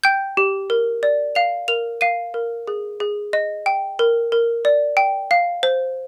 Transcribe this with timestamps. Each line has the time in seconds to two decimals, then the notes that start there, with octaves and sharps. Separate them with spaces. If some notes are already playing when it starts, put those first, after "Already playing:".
0.04 G5 G6
0.37 G4
0.70 A#4
1.03 D5
1.35 F5 F7
1.68 A#4 F7
2.01 F5 D#7
2.34 A#4
2.68 G#4
3.00 G#4
3.33 D#5
3.66 G5
3.99 A#4
4.32 A#4
4.65 D5
4.97 G5
5.31 F5
5.63 C5